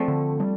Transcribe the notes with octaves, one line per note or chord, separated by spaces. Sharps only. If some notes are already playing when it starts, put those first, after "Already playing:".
Already playing: F3 A3 C4 D4
D3
G3